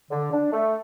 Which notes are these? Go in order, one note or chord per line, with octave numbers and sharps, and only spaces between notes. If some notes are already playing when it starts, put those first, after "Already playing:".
D3
D4
A3